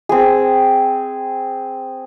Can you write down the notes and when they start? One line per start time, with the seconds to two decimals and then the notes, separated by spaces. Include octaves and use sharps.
0.09 C4 G#4